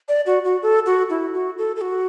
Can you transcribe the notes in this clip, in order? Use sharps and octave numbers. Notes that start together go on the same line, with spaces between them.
D5
F#4
F#4
A4
F#4
E4
F#4
A4
A4
F#4